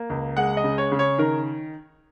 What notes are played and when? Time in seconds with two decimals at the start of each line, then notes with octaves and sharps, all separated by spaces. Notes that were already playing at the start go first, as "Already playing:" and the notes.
Already playing: A#3
0.10 C#2
0.37 G#3 F#5
0.57 D#5
0.64 C#3
0.78 C#5
0.92 C#3
0.99 C#5
1.18 D#3 A#4